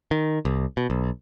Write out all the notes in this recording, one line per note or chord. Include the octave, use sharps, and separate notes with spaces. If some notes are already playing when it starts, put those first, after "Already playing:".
D#3
C2
B2
B1